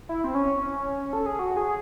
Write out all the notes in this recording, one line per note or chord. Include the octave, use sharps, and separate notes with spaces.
E4
C4
C#4
A4
G#4
F#4
G#4